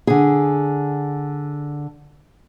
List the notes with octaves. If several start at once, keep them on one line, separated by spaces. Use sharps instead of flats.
D3 G#4